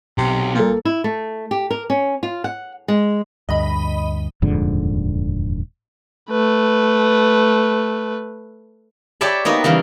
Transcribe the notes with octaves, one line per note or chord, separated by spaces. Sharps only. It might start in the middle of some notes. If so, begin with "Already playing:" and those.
B1 C3
A#2 A#3 A4
E4
A3
G4
A#4
C#4
F4
F#5
G#3
D2 G2 D#5 B5
D#1 F2 G#2 D3
A3 B4
G4 C#5 D5 E5 A5 B5
A#3 B3 D#4 F#4 B4
C#3 E3 G3 A#3